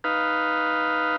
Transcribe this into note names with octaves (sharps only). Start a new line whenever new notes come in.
D#4 B4 F5